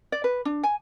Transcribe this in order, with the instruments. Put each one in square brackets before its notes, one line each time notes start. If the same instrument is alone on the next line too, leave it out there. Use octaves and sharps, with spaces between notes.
[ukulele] D5
B4
D4
G#5